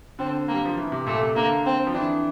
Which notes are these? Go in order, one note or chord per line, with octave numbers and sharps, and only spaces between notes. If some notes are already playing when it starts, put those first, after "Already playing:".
D3 C4
A#3
G3
F3
E3
C3
A#2 A3
C3
D3 A#3
C4
F3
E3 D4